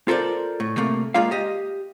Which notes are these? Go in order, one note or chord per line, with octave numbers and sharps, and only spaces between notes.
F4 A4 A#4 C5 D5
A2
C3 A3 A#3
G#3 A#3 F4 D5 F5
G4 D#5